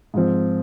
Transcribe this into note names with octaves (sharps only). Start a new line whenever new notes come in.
G#2 F3 C4